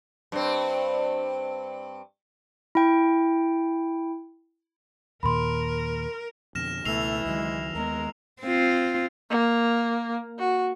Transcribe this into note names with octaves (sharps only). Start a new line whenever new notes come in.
G2 C4
E4 G5
D#2 A#2 D#3 A#4 B5 C6
F2 B2 D3 F6 A#6 E7
C#2 B2 E3 A3 E6 C7 F7
C#2 D#3 F#3 G#3
D#2 G#3 A#3 B3 A#4
C4 F4
A#3
F#4